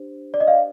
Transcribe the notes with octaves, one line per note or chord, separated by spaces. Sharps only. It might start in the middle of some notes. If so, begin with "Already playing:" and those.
Already playing: D4 G4 C5
D5
D#5
D5 F5